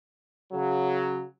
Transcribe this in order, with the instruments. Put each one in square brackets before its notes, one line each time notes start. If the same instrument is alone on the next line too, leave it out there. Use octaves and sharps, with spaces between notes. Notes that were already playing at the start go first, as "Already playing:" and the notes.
[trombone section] C#3 F#3